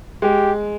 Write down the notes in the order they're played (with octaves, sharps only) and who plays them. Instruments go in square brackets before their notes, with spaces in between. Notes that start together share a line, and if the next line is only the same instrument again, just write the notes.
[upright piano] G#3 [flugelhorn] G4